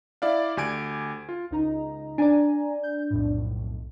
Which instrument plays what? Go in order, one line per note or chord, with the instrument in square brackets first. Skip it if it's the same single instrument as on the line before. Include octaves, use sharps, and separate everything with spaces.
[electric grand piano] E4 D5 E5 F5
D2 G4 G#5 G#6 D7
F4
[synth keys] C#2 D#4 A#5
[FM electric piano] D4 D5 [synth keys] G#5 A#5
[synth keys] G6
B1 F2 A2